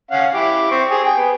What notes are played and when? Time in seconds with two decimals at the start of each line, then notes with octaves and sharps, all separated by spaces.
0.11 C#4 F5 F#5
0.34 E4 G4 D6
0.71 C4 C#6
0.90 G4 G#4 D#6
1.04 G5 G#5
1.17 B3